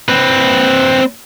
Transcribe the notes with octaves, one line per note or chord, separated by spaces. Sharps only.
C4 B4